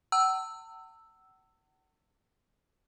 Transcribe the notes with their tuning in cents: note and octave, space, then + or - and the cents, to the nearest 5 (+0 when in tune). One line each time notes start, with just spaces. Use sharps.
F#5 +40 A5 +45 E6 +0